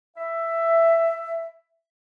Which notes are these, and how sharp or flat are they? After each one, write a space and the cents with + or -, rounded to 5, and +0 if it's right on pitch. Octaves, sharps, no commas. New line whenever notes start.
E5 +10